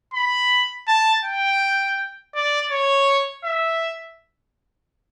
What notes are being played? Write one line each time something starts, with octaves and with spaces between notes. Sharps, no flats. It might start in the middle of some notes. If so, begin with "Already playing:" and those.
B5
A5
G5
D5
C#5
E5